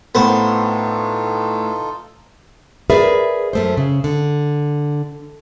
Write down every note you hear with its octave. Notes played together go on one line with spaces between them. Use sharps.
A2 B3 D#4 F4 A4 C5
G#4 A#4 B4 D5 E5
F#2 A3 C5
C#3
D3